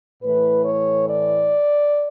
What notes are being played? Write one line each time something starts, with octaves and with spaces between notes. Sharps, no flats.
A2 E3 A3 B4
C#5
D5